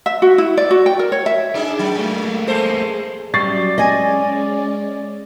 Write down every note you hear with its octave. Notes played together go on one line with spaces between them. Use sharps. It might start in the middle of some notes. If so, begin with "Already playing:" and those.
E5
F#4
E4
D5
F#4
G5
A#4
C#5
E5
D4 D#4 G#4
F#3
A3 A#3
G#3 A4 C5
F#3 G3 C#4 D5 E5 C#6 A6 C7
G#3 C#4 D#5 G#5